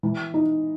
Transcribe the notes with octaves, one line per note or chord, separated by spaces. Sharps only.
E3
D#4